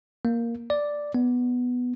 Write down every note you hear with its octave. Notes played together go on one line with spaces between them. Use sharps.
A#3
D5
B3